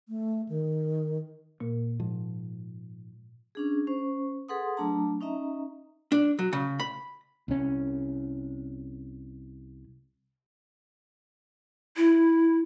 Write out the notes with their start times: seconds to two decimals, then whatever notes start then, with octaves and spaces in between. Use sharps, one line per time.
0.09 A3
0.49 D#3
1.60 A#2 A#3
2.00 G#2 F3
3.55 C#4 D4 G#4
3.87 C#4 C5 C#6
4.49 G#4 A4 B4 F#5 C6 D#6
4.77 F#3 A3 D4 A5 A#5
5.21 C#4 D#4 D#5 E5 A#5
6.12 D4
6.39 F#3
6.53 C#3
6.79 B5
7.48 C2 C#4
11.97 E4